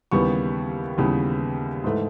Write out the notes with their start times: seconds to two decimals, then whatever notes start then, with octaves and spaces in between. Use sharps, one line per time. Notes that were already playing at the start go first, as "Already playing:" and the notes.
0.11 D#2 C#3 E3 G3 B3 C#6
0.98 D#2 C#3 E3 G3 B3
1.84 G#2 E3 A3